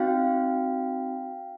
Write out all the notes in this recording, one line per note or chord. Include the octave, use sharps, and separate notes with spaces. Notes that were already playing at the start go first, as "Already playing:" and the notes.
Already playing: C4 D#4 F#4 F5 G5